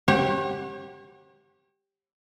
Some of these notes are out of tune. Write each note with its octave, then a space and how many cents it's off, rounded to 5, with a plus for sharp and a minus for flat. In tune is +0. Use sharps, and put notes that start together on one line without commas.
G4 +0 C#5 -40 F#5 +0